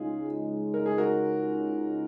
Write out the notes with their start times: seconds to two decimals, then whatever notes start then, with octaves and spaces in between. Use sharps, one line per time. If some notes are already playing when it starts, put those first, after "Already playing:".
Already playing: C#2 C#3 G#3 D#4 F4 G#4
0.74 A#4
0.86 G#4
0.98 F#4 A#4